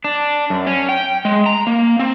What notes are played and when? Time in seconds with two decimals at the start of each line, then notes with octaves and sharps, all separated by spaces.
0.04 D4
0.50 F#2
0.67 C#4
0.89 G5
1.25 G#3
1.46 A#5
1.67 A#3
1.99 C4